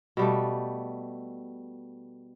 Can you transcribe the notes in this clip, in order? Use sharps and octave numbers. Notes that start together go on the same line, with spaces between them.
B2 G3 A3